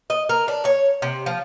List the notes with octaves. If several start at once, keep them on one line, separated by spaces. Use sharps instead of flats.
D#5
A#4
D4
C#5
C3
F3